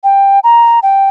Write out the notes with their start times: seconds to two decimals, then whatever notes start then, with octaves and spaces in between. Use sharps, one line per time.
0.04 G5
0.44 A#5
0.83 G5